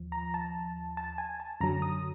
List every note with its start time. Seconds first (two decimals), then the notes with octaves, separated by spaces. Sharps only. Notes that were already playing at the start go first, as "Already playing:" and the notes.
Already playing: D#2 F3
0.12 A#5
0.34 A5
0.97 A5
1.18 G#5
1.40 A5
1.61 F#2 D3 F#3 A#5
1.82 D#6